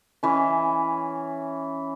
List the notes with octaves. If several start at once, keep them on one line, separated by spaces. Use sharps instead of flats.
E3 C#4